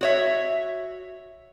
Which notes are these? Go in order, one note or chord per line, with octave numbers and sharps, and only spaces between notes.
F#4 C#5 E5